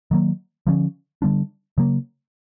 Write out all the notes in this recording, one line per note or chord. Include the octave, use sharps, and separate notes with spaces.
D#3 F#3 A#3
D3 F3 A#3 C#4
D3 G3 B3 D4
C#3 F#3 A#3